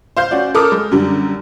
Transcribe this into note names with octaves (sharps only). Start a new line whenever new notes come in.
C5 F5 G6
C#4 F#4 D5
A4 A#4 D6 D#6 F6
G#3
F#2 D3 G3